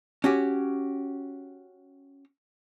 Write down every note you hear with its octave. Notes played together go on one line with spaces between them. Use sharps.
C#4 F#4 G4